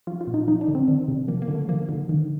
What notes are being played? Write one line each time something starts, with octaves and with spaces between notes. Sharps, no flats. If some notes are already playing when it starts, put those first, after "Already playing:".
F3 F4
F4
A#2
D#4
F3 D#4
D4
D3
C4
D#3 D4
C3
F3 A#3
A#3
D3
A3
F3 A#3
D3
D#3